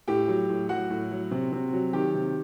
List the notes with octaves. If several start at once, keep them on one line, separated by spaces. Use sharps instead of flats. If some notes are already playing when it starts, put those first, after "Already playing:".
A2 G4 G5
F#3
A2
F#3 F#4 F#5
A2
F#3
C3
C3
F#3
D#3 G4 G5
C3